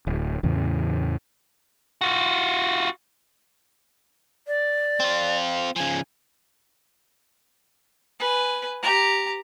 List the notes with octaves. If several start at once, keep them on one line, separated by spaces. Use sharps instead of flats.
D1
E2 A2 C#3 E3
F4 F#4
D5
C4 F4
C#3 F3 G#5
B4 G#5
G4 A#5